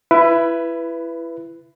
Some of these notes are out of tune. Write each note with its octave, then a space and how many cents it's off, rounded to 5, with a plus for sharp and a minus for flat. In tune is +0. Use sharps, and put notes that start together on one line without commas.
E4 +20 B4 +0